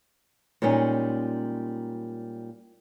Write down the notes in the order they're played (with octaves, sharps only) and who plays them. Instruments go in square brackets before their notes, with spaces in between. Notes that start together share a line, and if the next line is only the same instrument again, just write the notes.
[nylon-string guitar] A#2 G3 G#3 C#4 D#4